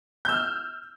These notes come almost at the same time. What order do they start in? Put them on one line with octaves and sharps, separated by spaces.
G6 E6 F6